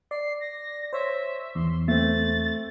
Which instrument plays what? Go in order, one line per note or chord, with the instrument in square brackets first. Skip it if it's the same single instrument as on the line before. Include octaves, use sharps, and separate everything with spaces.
[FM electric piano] D5 [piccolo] C7
[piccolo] A#6
[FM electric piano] C5 C#5 [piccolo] E5
[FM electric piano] E2 [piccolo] C6
[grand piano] A3 C4 [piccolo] A6